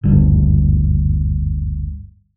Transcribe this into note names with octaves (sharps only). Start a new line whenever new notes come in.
F#1 D2 G2